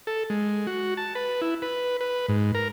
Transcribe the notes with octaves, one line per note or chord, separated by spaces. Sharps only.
A4
G#3
F#4
A5
B4
E4
B4
B4
G#2
A#4